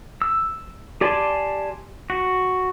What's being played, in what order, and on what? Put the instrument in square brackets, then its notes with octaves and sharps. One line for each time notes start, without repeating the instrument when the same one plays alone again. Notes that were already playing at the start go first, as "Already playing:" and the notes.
[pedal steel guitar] E6
G4 D5 G#5 A5 C6
F#4